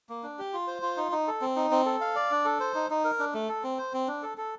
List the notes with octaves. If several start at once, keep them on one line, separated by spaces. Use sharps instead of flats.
A#3
D4
G4
F4
C5
F4
D#4
D#4
A4
C4
D#4
C4
A4
F5
D5
D4
A4
C5
D#4
D#4
A#4
D4
A3
A4
C4
C5
C4
D4
A4
A4